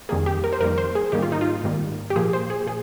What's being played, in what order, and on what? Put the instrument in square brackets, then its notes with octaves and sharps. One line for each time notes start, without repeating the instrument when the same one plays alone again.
[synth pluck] F2 D#3 G3 A#3 G#4
G4
A#4
C5
F2 D#3 G3 A#3 A#4
C5
G#4
G#2 D#3 G3 A#3 G4
F4
D#4
F4
G#2 D#3 G3 A#3
G4
A#2 F3 A#3 G#4
C5
G#4
A#2 G#4